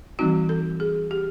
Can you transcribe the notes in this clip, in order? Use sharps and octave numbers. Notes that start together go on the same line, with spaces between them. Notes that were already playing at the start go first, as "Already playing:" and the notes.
E3 G3 C4 D#4 F#4
A4
G#4
G4